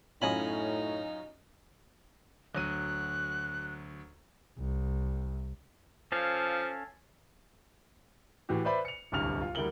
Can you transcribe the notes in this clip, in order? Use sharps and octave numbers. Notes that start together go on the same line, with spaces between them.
F#2 A2 C#4 D#4 F4 D#5 G#5 B5
D2 F#3 F#6 D#7
C2
F3 C#4 A4 F5
A2 E3 F#4 G4
B4 C5 D5 E5 B5
C#7 F7
D1 G1 C2 G2 F6 F7
F4
D2 G3 E4 A#4 F#7 G7